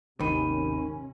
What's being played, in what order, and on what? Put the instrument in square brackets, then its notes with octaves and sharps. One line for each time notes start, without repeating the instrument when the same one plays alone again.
[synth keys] G#1 D#2 [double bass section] C3 C#4 [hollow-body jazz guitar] D#3 [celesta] B5 D#7